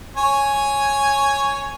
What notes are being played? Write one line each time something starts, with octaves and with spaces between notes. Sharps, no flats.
C#5 G#5